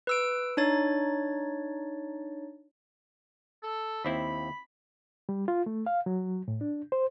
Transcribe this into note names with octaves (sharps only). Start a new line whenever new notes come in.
B4 E6 D7
D4 D#4 C#5 A6
A4
D#2 C4 E4 B5
G3
F4
A3
F5
F#3
A2
D4
C5